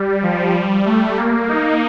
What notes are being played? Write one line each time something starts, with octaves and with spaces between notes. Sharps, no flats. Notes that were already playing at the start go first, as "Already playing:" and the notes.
Already playing: G3
F3
G3
A3
A#3
D#4